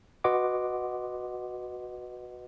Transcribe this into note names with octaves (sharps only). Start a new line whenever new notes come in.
F#4 B4 D#5 F#5 C6 D6